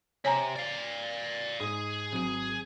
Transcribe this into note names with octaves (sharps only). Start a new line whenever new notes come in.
C3 C#5 G#5 A#5
D5 F5
G#2 G#4
G#1 F#3 D#7